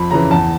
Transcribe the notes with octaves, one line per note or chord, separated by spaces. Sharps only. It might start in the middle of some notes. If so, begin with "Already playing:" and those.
Already playing: F2 B5
C#3 E3 A#5
E2 A5